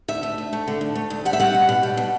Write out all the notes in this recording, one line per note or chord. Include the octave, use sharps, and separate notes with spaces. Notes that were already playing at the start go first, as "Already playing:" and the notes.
D2 E5
A3
D2
A3
D3
D2
A3
D2
G3 F#5
E5
G3 F#5
B2
B2
G3
B2